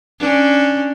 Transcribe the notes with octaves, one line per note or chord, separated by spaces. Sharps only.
C#4 D4